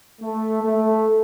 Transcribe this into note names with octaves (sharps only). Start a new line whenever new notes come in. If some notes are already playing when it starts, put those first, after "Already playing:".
A3
A3